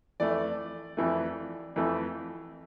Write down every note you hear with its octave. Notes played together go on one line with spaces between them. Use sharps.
F2 E3 A3 D5
F2 E3 A3
F2 E3 A3